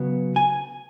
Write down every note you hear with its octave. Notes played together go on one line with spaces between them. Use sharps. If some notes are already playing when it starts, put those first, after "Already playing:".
Already playing: C#3 F#3 B3
G#5